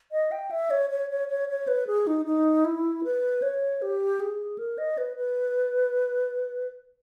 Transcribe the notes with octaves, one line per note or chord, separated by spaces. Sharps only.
D#5
G5
E5
C#5
C#5
C#5
C#5
C#5
B4
G#4
D#4
D#4
E4
B4
C#5
G4
G#4
A#4
D#5
B4
B4